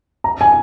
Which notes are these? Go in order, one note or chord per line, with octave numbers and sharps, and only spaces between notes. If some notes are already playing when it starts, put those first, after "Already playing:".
A#5
G#5